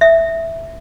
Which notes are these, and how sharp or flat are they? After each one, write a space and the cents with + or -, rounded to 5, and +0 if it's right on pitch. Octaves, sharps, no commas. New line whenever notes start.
E5 +0 D#6 +25